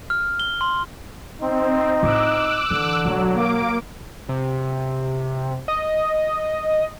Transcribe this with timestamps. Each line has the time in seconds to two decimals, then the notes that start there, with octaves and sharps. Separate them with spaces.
0.10 F6
0.40 G7
0.61 C6
1.41 C4 D#4
2.03 A2 F4 D6 E6 F#6
2.71 D3 E3
3.05 B1 F#3 G#3
3.34 A#3 D6 D7
4.29 C3
5.68 D#5